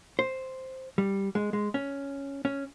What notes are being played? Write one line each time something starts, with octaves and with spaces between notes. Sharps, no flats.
C5
G3
G#3
G#3
C#4
C#4